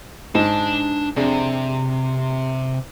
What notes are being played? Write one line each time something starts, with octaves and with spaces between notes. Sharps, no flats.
G#2 D4 A5
F2 C3 D4 G#4